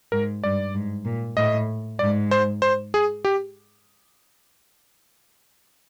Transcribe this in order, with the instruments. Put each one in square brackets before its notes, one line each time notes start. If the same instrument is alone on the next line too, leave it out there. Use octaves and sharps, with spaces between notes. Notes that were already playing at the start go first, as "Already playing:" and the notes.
[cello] G#2 [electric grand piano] A#4
[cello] G2 [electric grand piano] D5
[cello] G#2
A#2
[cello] A2 [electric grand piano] D#5
[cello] G#2 [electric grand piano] D5
[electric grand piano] C5
C5
G#4
G4